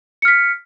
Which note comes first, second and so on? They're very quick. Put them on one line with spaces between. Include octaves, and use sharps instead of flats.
C#7 F6 B6